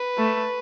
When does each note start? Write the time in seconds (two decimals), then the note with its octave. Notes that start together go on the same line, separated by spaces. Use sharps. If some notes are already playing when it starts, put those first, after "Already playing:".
Already playing: B4
0.18 A3